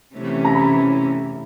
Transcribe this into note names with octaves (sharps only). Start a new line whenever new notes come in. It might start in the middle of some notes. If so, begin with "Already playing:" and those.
C3 E3 A3 C#4 E4
A#5
B5